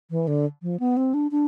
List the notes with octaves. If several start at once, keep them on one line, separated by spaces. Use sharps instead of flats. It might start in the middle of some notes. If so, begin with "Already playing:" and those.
E3
D3
F3
B3
C4
D4
D4